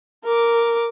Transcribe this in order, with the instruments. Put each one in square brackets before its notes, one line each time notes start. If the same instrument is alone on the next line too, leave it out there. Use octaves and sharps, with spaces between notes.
[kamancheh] A#4 D6